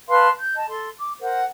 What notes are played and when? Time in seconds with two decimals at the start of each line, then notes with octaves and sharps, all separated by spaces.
0.08 B4 F5 A5 C6
0.39 G6
0.55 D#5 A5
0.69 A4 C6
0.97 D6
1.21 A#4 C5 F#5